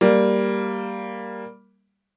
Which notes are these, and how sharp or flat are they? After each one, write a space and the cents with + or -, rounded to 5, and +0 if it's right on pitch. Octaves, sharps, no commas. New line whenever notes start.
G3 +0 A#3 +0